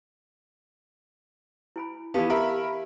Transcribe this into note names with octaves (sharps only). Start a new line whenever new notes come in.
E4 G#5 B5
E3 B3 G4 F5 A5
G4 A#4 E5 B5